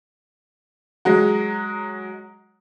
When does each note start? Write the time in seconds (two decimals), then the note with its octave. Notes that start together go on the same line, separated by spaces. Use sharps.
1.05 F#3 G#3 F#4